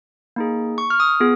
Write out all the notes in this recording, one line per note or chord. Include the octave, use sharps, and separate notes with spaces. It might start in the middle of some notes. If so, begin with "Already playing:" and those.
A#3 D#4 G#4
C#6
F6
D#6
B3 F4 G#4